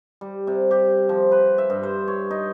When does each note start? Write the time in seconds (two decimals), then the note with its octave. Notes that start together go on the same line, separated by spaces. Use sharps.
0.21 G3
0.47 C3
0.71 G4
1.09 F3
1.32 B4
1.58 E5
1.70 G2
1.83 C5
2.08 C#5
2.31 D#4